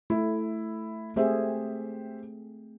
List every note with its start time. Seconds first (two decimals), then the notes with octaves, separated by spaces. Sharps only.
0.10 A3 E4
1.16 A3 C4 G4 G#4 C5 E5